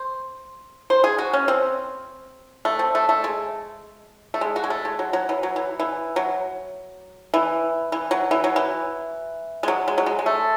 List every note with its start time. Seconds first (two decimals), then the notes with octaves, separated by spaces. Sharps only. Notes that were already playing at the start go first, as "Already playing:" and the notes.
Already playing: C5
0.90 C5
1.04 G#4
1.18 F#4
1.33 C#4
1.48 C4
2.65 A3
2.79 C4
2.95 A3
3.09 A3
3.24 G#3
4.34 A3
4.41 G#3
4.56 F#4
4.64 G#3
4.70 A3
4.85 G#3
4.99 F#3
5.13 F#3
5.29 E3
5.43 F#3
5.56 E3
5.79 E3
6.16 F#3
7.34 E3
7.92 E3
8.11 F#3
8.31 E3
8.44 F#3
8.56 E3
9.63 G#3
9.68 F#3
9.88 G#3
9.98 F#3
10.06 G#3
10.19 G#3
10.26 A3